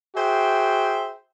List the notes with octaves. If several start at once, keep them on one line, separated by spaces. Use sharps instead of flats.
F#4 G#4 C5 E5 G5